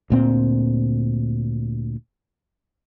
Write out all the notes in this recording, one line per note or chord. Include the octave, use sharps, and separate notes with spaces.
D2 A#2 C4